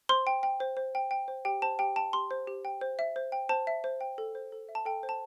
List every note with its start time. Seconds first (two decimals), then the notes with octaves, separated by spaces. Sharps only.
0.09 C5 C6
0.27 G5
0.43 G5
0.60 C5
0.77 C5
0.95 G5
1.11 G5
1.28 C5
1.45 G4 G5
1.62 C5 A5
1.79 G4 G5
1.96 G5 A5
2.13 G4 C6
2.31 C5
2.47 G4
2.65 G5
2.81 C5
2.99 E5
3.16 C5
3.32 G5
3.49 C5 A5
3.67 E5
3.84 C5
4.01 G5
4.18 A4
4.35 C5
4.52 A4
4.69 E5
4.75 A5
4.85 A4 G5
5.03 C5
5.09 A5